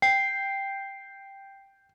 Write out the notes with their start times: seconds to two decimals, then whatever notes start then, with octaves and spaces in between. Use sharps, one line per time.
0.02 G5 C7